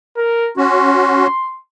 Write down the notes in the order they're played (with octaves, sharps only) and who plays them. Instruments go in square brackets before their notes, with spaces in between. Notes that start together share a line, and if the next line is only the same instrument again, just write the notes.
[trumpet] A#4
[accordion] C#4 F#4 [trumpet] C6